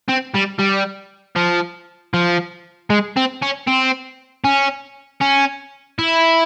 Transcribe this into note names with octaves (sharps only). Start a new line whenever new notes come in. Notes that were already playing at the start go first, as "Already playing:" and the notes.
C4
G3
G3
F3
F3
G#3
C4
C#4
C4
C#4
C#4
E4